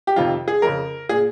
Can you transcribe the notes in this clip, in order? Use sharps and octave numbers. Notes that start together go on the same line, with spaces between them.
G4
F2 C3 D#3 F4
G#4
F2 C#3 A#4
A#2 G#4